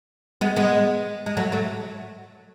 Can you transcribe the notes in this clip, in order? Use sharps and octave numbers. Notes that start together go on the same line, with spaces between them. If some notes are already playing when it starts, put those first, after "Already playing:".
G#3 B3
G#3 B3
G#3
F#3 A3
F#3 A3